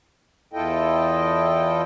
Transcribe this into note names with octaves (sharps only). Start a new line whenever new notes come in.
E2 E4 F4 A4 D#5 G5